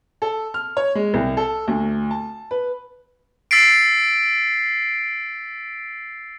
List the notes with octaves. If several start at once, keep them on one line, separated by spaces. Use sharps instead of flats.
A4
F6
C#5
G#3
C2
A4
D2
A5
B4
E6 A6 B6 C7 D7